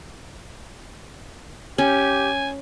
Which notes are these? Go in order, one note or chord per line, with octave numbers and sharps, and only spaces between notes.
C#4 G4 G#5